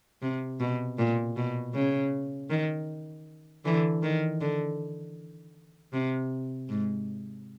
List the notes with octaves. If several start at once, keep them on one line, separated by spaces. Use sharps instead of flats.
C3
B2
A#2
B2
C#3
D#3
D3 E3
D#3
D3
C3
G#2